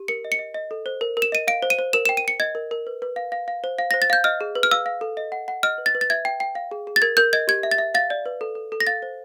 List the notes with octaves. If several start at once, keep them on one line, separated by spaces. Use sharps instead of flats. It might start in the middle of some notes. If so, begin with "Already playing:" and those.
Already playing: G4
A#4 C#7
D#5
C#7
D#5
D#5
A4
C5
A#4
A#4
E7
D#5 D#7
F5 D7
C5
D#7
C5
A#4 E7
G5 E7
D#7
G5 C#7
D#5 G#6
A#4
A#4
B4
B4
F5
F5
F5
C5
F5
C5 A#6
A6
F5 G6
D#5 F6
G#4
B4
F6
F5 E6
F5
A4
D#5
F#5
F#5
D#5 F6
B4
A6
B4
A6
E5 G#6
G5
G5
F5
G#4
G#4
A6
A#4 G#6
A#4 G6
D#5 G#6
G4 G#6
E5
A6
E5
F5 A6
D5
B4
A4
A4
A4
A#6
F5 A6
C5